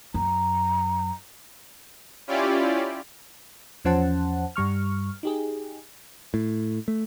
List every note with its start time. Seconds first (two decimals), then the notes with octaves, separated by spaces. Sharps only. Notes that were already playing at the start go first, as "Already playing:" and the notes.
0.14 F#2 A#5
2.27 C#4 E4 F4 G4 D5
3.85 E2 F3 C#4 C5 F#5 A5
4.56 G2 G3 C#6 F6
5.23 D#4 G4 G#4
6.34 A2
6.88 A3